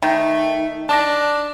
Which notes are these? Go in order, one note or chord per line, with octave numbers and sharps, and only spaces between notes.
D#3 A3
D4 A5 D6 A#6